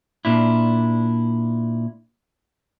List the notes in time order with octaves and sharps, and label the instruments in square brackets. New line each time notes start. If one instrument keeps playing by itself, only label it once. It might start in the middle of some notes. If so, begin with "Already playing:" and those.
[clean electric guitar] A#2 D4 E4